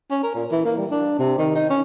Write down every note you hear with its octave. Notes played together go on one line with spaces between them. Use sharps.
C#4
A#4
A#2
E3
A#3
G3
D4
C3
D#3
D#4
C#4